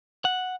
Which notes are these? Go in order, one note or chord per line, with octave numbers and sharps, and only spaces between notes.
F#5